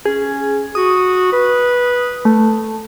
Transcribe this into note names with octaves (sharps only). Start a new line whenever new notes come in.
C#4 G#4
F#4 D#6
B4
A3